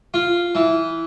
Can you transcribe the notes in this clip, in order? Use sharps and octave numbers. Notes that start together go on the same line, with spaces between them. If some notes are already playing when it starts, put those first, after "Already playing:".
F4
E3